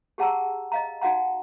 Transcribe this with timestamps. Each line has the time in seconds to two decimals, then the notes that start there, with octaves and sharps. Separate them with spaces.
0.18 G4 G#4 F#5 A5 A#5 E6
0.72 D#5 F5 A#5
1.01 D#4 F#4 F5 F#5 A#5